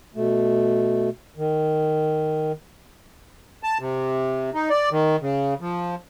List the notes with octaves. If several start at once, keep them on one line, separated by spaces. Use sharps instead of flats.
B2 A3
D#3
A5
C3
D#4
D5
D#3
C#3
F3